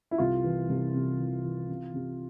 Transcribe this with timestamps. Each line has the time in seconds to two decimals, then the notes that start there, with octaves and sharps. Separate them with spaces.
0.11 E4
0.18 C2 F4
0.44 E3
0.69 C2
0.94 C3
1.18 E3
1.43 E3
1.69 C3
1.94 C3